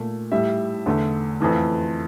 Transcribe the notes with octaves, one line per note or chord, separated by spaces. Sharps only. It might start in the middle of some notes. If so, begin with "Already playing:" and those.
Already playing: A#2 A3
A2 G3 E5
E2 D3 A3
F2 E3 A3